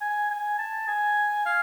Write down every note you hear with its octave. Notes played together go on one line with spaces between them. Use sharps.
G#5
G#5
A5
G#5
F5